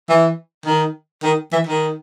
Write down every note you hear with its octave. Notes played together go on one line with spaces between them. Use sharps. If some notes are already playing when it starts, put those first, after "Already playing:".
E3
D#3
D#3
E3
D#3